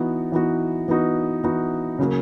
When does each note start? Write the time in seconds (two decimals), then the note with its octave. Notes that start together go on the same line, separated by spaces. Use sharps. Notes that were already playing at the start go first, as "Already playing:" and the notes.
Already playing: E3 B3 D#4 F#4
0.32 E3 B3 D#4 F#4
0.88 E3 B3 D#4 F#4
1.44 E3 B3 D#4 F#4
1.99 C#3 F#3 A#3